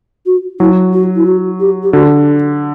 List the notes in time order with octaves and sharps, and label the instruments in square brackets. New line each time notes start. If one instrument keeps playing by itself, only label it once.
[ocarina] F#4
[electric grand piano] F#3 [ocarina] E4
[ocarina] F#4
E4
F#4
G4
G4
[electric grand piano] D3 [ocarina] F#4